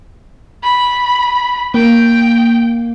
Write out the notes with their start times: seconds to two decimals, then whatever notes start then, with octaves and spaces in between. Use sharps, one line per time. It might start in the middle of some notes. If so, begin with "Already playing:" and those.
0.63 B5
1.74 A#3 G5